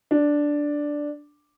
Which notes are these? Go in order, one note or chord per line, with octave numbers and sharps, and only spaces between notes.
D4